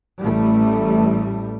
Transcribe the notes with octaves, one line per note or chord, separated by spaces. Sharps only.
A1 G3 A3